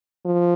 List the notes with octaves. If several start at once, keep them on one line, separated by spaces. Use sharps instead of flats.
F3